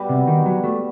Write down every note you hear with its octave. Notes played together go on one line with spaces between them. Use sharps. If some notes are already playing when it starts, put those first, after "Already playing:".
Already playing: G3 B3 F#4 B4
C3
D#3
F#3
A3